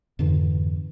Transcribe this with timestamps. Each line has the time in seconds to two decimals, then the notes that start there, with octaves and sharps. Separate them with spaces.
0.19 F2 G#2 D3 E3